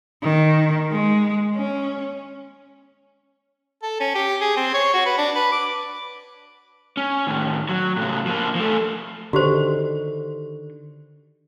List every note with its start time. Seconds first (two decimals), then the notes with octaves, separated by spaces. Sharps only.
0.23 D#3
0.90 G#3
1.55 C#4
3.83 A4
4.00 C#4
4.15 G4
4.41 G#4
4.57 C4
4.74 C#5
4.94 F#4
5.06 B4
5.18 D4
5.35 B4
5.52 D6
6.97 C#4
7.27 A2 D#3
7.69 F#3
7.97 A2 C#3
8.26 F3 A#3
8.55 F3 A3
9.33 D3 D#3 F#4 G4 C5